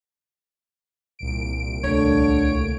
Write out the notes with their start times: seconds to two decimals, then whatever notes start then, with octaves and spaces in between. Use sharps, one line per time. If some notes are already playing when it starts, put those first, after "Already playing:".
1.19 C2 A#2 D7
1.84 D2 D3 C#5